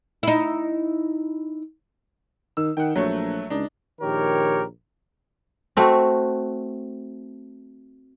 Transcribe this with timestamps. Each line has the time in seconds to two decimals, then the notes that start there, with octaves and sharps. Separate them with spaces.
0.23 D#4 E4
2.57 D#3 E6
2.77 D#3 F#5 G5
2.96 A#1 F#3 A3 C#5
3.50 C#2 D4 D#4
4.01 A#1 D#3 G4 A#4 C#5
5.77 A3 C4 F#4